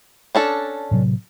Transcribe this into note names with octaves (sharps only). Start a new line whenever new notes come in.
C#4 D4 A4
A2 C3 F#3